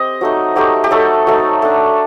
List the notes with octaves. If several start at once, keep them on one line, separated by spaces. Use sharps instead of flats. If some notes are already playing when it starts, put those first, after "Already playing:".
Already playing: C4 G4 D#5
F#3 A3 D#4
F#3 A3 D#4 G4
G4
F#3 A3 D#4 A4
F#3 A3 D#4
A3 D4